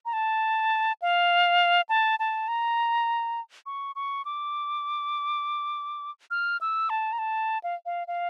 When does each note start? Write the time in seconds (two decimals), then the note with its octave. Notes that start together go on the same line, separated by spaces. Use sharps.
0.05 A#5
0.13 A5
1.02 F5
1.89 A5
2.19 A5
2.48 A#5
3.66 C#6
3.96 C#6
4.25 D6
6.31 F6
6.61 E6
6.90 A5
7.13 A#5
7.19 A5
7.64 F5
7.86 F5
8.07 F5